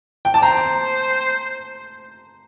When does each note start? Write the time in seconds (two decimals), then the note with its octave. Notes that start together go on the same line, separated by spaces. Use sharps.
0.25 G5
0.34 D5 A5
0.42 C5 A#5